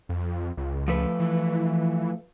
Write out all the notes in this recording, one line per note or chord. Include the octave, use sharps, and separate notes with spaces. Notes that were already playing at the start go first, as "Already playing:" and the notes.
F2
C#2
F3 A3 B4
E3